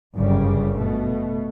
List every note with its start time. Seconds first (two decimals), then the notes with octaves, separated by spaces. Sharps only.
0.16 G1 F#2 C#3 G3
0.76 B2 A3